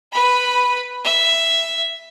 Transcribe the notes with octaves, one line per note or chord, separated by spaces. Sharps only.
B4 B5
E5